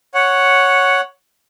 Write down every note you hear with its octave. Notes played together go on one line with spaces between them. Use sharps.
C#5 F#5